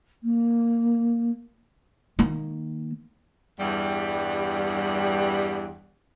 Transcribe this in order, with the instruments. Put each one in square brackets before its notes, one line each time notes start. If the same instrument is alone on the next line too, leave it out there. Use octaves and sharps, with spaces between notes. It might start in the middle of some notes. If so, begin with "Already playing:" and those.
[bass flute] A#3
[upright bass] D#3 A#3
[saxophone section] E2 G2 G3